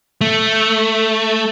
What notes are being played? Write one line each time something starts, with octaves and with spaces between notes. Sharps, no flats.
A3